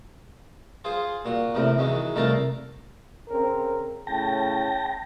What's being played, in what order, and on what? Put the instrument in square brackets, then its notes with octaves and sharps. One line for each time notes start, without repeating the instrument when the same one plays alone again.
[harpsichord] F4 G#4 C5
A#2 F#4
E2 A2 C3 A#4
E2 D#3 F#3 G#3
C2 A3 A#4 F5 A5 A#5
[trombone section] C#3 C4 A#4
[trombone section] A2 C#3 [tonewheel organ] G5 A5 A#6